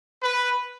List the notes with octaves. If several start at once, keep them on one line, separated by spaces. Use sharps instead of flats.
B4